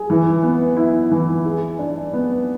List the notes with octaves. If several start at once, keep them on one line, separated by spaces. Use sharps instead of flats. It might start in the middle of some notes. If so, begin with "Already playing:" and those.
Already playing: G#4
E3
B3
E4
E3
G#4
D4
B3